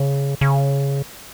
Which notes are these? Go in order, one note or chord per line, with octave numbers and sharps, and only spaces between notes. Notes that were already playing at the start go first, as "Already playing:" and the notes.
Already playing: C#3
C#3